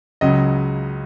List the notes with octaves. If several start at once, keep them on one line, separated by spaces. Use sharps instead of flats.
C#2 C#3 F#3 D#5